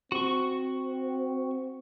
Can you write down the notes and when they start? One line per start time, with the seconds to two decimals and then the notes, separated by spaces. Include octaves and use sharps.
0.12 C4 F#4 C#6